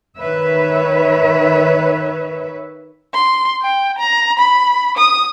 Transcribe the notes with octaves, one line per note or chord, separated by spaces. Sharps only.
D#3 B4 C#5 E5
C6
G5
A#5
B5
D#6